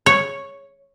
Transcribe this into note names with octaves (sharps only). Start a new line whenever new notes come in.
C#5